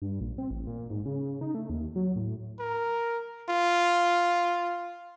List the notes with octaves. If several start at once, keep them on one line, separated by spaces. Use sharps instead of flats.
G2
A#1
C4
A1
A#2
G#2
C#3
D#4
A3
D#2
F#3
A2
A#4
F4